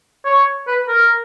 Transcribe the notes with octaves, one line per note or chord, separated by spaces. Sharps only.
C#5
B4
A#4